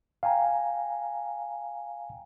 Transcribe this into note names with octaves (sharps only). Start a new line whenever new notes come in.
F5 G5 G#5 A#5